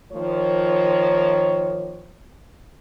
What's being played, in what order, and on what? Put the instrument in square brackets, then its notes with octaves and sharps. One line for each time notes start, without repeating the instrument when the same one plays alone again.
[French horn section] D#3 F3 A#3 C#5